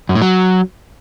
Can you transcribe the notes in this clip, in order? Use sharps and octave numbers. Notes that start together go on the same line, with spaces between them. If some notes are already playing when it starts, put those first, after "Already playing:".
F#2
A2
F#3